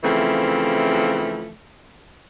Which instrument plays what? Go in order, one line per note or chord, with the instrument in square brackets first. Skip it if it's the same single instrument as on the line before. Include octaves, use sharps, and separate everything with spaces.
[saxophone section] C#3 E3 F3 A3 C4